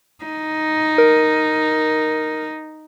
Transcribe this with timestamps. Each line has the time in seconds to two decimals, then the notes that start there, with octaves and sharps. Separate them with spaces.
0.24 D#4
0.98 A#4